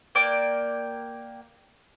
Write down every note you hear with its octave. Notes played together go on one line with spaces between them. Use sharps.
A#3 D5 G5 D6